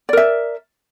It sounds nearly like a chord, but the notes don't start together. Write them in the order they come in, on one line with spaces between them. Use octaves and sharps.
D5 A#4 E5